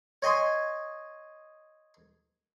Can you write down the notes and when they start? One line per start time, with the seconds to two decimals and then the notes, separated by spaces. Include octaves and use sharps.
0.22 C#5 D#5 G#5 C6